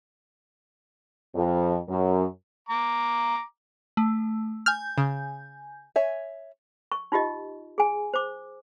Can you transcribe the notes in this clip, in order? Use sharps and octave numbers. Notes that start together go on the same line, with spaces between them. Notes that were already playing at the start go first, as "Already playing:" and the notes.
F2
F#2
A#5 D6
A3
G#5 F6 G6
C#3
C#5 E5 G#5
C#6
D#4 F4 G4 D#5
G#4 G#5
C5 D6